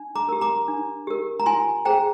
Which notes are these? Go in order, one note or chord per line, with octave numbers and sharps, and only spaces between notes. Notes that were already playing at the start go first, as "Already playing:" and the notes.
Already playing: D4
A#5 D6
G4 A#4
A#5 D6
D4
G4 A#4
A#5
F4 G#5 C6
G#4 C5 G5 A#5